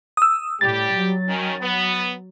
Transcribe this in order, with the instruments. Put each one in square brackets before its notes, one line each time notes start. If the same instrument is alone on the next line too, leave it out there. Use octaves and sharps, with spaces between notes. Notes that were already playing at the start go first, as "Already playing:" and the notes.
[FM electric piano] D#6 E6
[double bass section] A2 [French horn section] G3 G4 [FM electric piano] A6
[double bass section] F#3
[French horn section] D#3 C#4
B3